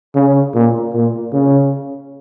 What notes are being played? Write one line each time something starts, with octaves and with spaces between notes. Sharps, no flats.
C#3
A#2
A#2
C#3